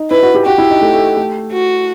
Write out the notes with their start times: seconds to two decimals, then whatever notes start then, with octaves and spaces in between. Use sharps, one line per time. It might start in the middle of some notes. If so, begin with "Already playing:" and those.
Already playing: D#4
0.11 E4 B4
0.23 F#4
0.35 G4
0.46 F#4 G4
0.58 E4
0.70 D#4
0.81 A3
0.93 A3
1.17 A3
1.52 F#4